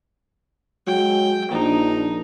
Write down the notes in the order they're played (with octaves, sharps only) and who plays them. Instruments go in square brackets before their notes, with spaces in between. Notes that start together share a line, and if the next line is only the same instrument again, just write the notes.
[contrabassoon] F#3 [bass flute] G#3 [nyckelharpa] G5
[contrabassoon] A#1 [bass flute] D4 [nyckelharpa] D#4